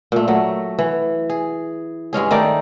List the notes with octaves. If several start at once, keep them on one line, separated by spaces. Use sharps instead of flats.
A#2 A3
F#3 A3
E3
G#4
G2 G#3 C#4 G#4
D#3 A3 D#4 D5